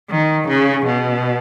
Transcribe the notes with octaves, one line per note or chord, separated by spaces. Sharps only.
D#3
C#3
B2